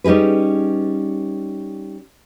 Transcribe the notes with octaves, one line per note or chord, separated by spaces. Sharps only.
G3 C#4 D#4 G#4 B4